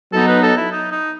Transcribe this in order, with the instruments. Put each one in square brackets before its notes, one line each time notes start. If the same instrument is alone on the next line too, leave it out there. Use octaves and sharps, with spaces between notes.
[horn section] F#3 B3 D#4 [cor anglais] A4
[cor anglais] B4
A4
E4
D#4
D#4